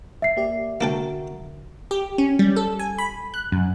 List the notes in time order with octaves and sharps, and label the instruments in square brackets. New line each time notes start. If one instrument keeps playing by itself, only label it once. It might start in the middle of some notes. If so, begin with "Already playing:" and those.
[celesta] E5 C7
[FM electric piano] A#3 G4 D5 [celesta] E5
[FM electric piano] D3 F#4 A#4 [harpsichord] A#3 A4 G5
[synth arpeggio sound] G4
C#4
G3
A4
G#5
B5
F#6
F#2